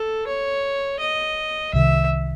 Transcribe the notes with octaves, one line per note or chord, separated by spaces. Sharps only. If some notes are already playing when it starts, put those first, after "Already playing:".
Already playing: A4
C#5
D#5
C2 C3 D#3 E5